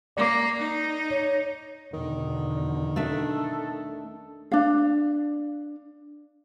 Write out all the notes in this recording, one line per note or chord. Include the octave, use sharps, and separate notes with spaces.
A#3 D5 D6
D#4
C#5
E2 B2 D3 D#3
A3 D4 A4 E5
D4 F5